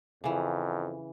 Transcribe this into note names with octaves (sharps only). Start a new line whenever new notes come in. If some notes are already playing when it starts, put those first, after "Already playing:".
F2 C#3 E3